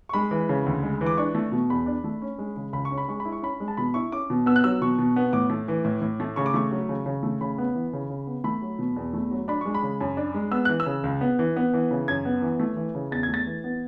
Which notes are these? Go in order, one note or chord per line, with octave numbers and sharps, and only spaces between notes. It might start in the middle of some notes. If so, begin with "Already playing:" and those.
C#6
G#3 B5
E3
C#3
D2
G#3
E3
D6
D4 C#6
A3
B2
E2 B5
D4
A3
C#4
G#3
C#3
C#2 B5
C#6
C#4
B5
G#3 C#6
B5
E4
C#6
C#4 B5
G#3
A5
B2 B5
E4 C#6
C#4 D6
B2
B3 E6
F#6
F#3 E6
B2 C#6
B2
B3
A2 D6
A3
E3
A2
A2
A3
C#3 C#6
D6
A3 C#6
F#3
C#3
C#3
A3
C#3 B5
B3
E3
C#3
C#3
B3
A3 B5
F#3
B2
E2
A3
F#3
D4 B5
G#3 C#6
B5
C#3
F#2
D4
G#3
B3 E6
E3 F#6
E6
C#3
C#2
B3
E3
B3
E3
C#3
F#2 G#6
B3
E3
A3
E3
C#3
E2 A6
G#6
A3
A6
E3
B3